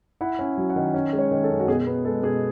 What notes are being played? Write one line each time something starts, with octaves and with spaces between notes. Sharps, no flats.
E4 F#5
C#4
F#3
F#5
D#3
C#4
G#3
C#5
D#3
A4
F#2
F#4
B2 G#4
B3
G#3 A4
B2 G#4